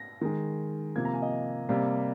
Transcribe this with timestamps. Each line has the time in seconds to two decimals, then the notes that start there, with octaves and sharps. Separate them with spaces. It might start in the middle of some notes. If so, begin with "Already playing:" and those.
Already playing: A#6
0.21 D#3 G#3
0.96 C3 F3 A#3 G#6
1.05 A#5
1.14 G#5
1.22 D#5
1.69 C3 G3 A#3